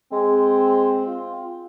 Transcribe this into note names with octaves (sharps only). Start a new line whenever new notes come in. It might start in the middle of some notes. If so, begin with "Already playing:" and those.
G#3 C4
F4